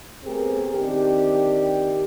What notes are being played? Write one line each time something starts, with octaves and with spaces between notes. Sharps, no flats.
A3 B3 C4 G4 G#4 A#4
D#3 C4 D4 G4